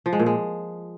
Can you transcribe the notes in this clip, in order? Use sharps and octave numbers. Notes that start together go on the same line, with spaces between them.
F3
G#3
A#2
G#3